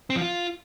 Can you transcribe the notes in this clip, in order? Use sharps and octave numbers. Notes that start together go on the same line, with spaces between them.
C4
F3
F4